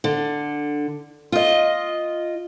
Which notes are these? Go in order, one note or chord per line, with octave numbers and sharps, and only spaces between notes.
D3
F4 D#5